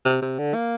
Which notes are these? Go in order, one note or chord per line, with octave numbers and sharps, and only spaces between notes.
C3
C3
D3
A#3